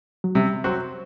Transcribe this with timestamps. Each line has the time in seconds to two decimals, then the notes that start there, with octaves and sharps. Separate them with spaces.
0.24 F#3
0.35 C3 G3
0.64 F#3 C4 F#4